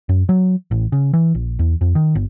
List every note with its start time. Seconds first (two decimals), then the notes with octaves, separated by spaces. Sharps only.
0.09 F#2
0.29 F#3
0.71 A1
0.92 C#3
1.13 E3
1.35 A#1
1.59 E2
1.81 F2
1.95 D#3
2.15 G1